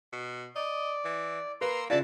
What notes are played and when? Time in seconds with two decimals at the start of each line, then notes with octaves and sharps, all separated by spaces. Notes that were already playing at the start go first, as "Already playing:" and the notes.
0.13 B2
0.56 D5 D#5
1.05 E3
1.61 A#3 B4 A#5 C6 E6
1.90 C#3 E3 F4 D5 E5 A5